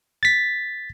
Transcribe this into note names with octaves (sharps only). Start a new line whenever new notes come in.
A6 B6